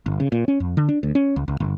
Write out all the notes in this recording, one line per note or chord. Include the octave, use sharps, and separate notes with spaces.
G1
C#3
A#2
C#4
F2
D3
D4
D2
C#4
C#2
C#2
G1